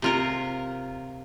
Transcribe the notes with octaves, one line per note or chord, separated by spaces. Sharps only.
C3 F4 A#4